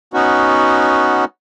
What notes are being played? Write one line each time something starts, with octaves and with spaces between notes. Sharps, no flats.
B3 C#4 D#4 F#4